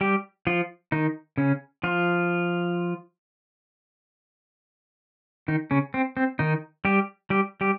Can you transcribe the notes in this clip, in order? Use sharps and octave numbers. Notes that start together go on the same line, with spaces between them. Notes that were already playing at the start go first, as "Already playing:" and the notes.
G3 G4
F3 F4
D#3 D#4
C#3 C#4
F3 F4
D#3 D#4
C#3 C#4
C4
C4
D#3 D#4
G3 G4
G3 G4
G3 G4